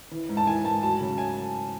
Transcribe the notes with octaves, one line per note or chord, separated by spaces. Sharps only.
E3
G#2
A5
E3 G#5
G#2 A5
F#3 A5
C#3
G#5